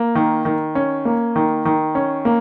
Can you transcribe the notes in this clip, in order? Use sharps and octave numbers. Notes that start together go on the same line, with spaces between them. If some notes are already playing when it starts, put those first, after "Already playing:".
Already playing: A#3
D#3
D#3
C#4
A#3
D#3
D#3
C#4
A#3